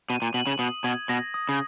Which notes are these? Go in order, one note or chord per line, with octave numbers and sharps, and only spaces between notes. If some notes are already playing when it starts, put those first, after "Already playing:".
B2 D#7
A#2
B2 F#7
C#3
B2 D#6
B2 G#6
B2 A#6
D#6
C#3